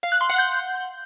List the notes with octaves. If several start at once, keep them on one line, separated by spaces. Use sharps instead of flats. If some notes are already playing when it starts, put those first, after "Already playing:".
F5
F#6
C6
F#5
G6